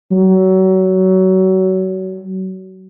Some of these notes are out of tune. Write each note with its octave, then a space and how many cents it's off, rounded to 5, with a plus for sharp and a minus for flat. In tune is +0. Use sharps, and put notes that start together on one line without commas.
F#3 +30